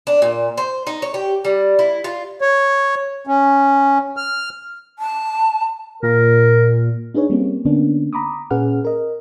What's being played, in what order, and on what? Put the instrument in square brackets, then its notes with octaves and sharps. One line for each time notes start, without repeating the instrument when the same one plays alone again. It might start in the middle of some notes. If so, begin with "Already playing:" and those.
[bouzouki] D4
A#2
C5
D#4
C#5
G4
G3
E4
F4
[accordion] C#5
C#4
F6
[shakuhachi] A5
[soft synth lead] A#2 [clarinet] A#4
[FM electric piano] D4 D#4 G#4 B4 C#5
G3 A#3 C4 C#4
D3 A#3 B3 C#4 D4
A#5 B5 D6 D#6
A#2 C#4 G#4 B4 F#5 F6
A#4 D#5